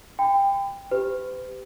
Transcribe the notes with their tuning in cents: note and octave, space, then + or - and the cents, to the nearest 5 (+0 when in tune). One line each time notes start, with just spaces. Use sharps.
G5 +20 B5 +40
G4 +0 B4 +45